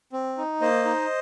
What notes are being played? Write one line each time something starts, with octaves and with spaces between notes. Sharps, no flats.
C4
D#4
A#3 C5 D#5
D#4